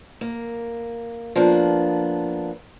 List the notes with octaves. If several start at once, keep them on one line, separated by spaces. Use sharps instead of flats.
A#3
F3 A#3 B3 D4